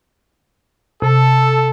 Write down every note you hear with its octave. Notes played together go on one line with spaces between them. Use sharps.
C3 A4